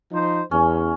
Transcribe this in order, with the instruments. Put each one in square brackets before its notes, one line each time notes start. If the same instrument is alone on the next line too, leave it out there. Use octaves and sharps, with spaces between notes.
[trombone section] F3 D#4 C5
[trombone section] E2 [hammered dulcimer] C#4